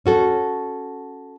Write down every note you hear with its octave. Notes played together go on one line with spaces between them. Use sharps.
C#4 F#4 A4